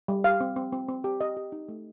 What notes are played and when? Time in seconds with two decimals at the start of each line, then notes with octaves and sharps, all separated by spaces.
0.08 G3
0.24 G4 F5
0.41 C4
0.56 C4
0.73 C4
0.89 C4
1.04 G4
1.20 G4 D#5
1.37 G4
1.52 D#4
1.69 A3